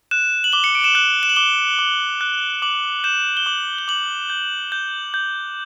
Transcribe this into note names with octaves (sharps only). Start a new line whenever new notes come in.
F#6 E7
F#7
D6 G7
C#7
D7
E7
F#6 F#7
E7
F#7
D6 G7
D6
F#6
D6 F#7
G6 E7
G7
D6 F#7
G7
D6 F#7
G6
G6
G6